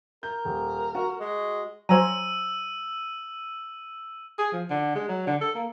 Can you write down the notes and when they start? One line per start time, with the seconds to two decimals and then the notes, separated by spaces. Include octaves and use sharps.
0.23 A#4 G6
0.45 D#1
0.95 F#4
1.20 G#3
1.89 F#3 C5 G#5 A#5 E6 D#7
4.38 G#4
4.52 F3
4.70 D3
4.95 G#3
5.08 F#3
5.27 D3
5.41 A4
5.55 A#3